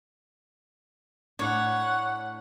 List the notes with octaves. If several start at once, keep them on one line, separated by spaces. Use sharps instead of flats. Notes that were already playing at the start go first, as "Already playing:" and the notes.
A2 D4 C#5 F#5